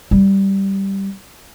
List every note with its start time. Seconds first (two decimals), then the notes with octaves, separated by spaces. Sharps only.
0.11 G3